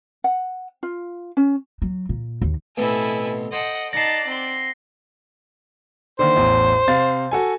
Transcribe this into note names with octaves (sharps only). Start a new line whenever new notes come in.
F#5
F4
C#4
F#3
A#2
D#2
A1 B2 C4 E4 A4 G#5
C5 D#5 F#5 G5 A5
D#4 D5 F#5 A5 A#6 C7
C4 C6
D3 D#3 A#3 C5
A1 E2
C3 F5 A6
F#4 A4 G#5